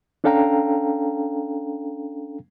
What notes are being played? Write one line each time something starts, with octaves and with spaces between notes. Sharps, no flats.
C#4 D4 A4 F5 G5 A#5